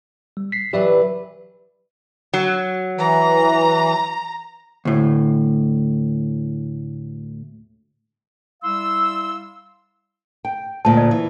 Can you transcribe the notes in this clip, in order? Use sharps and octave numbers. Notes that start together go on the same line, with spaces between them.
G3
B6 C7
E3 F#3 G4 B4 D5 E5
F#3
E3 A#5
D2 A2
G3 E4 F5 C6 E6
G5
D2 A#2 A5
D5
E3